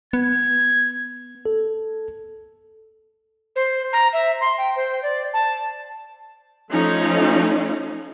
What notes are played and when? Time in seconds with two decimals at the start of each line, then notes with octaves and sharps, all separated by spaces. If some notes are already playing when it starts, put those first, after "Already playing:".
0.13 B3 G#6
1.46 A4
3.56 C5
3.93 A#5
4.13 E5
4.41 C6
4.58 G5
4.76 C5
5.03 D5
5.34 A5
6.70 F3 A3 C#4 D#4